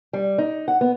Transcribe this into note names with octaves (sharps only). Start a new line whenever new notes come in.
G3
D#4
F#5
B3